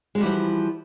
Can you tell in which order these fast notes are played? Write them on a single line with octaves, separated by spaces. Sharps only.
G#3 F#4 G3 E3 F3